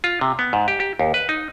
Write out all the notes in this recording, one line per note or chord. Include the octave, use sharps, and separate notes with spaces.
F4
C3
B3
G#2
G4
G4
D#2
B4
D#4